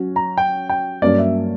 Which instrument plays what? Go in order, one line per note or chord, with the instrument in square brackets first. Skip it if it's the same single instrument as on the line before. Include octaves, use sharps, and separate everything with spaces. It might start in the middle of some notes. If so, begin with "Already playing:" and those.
Already playing: [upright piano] F#3 C#4 F#4
[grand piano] A#5
G5
G5
[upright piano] G2 F#3 A#3 C#4 [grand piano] D5
[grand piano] E5